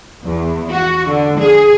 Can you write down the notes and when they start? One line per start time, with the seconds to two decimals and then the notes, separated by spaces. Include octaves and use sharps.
0.24 E2
0.72 F#4
1.09 D3
1.40 G#4